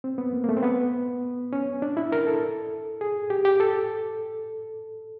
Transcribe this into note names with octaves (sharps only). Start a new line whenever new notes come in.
C4
B3
A#3
A#3
A3
C4
B3
C#4
D4
E4
A#4
A4
G#4
G4
G4
A4